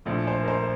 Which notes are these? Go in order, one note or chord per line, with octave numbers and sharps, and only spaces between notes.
A#1 A2 F3
C5
A#4
C5